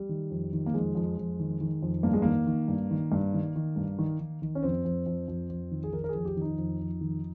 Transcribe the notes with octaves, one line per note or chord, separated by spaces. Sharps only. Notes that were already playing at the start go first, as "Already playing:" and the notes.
Already playing: G3
D#3
F2
D#3
A#3
F2 G#3
F2
F2
D#3
D#3
F2
G2 A#3
G#3
D#3 A#3
D#3
G2
D#3
G2
D#3
D#3
G2
D#3
D#3
D#3
C#4
F2 C4
F2
F2
F2
F2
D#3
G#4
D#3 A#4
A#4
G#4
F2
G4
D#3 D#4
F2
F2
D#3